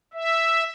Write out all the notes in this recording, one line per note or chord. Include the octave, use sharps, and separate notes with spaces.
E5